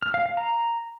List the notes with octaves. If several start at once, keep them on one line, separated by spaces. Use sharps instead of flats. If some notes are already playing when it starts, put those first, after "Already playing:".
F6
F5
F5
A#5